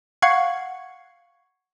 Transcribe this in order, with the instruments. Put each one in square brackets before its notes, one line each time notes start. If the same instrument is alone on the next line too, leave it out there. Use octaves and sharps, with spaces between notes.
[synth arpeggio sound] F5 F#5 C#6 G#6 C7 C#7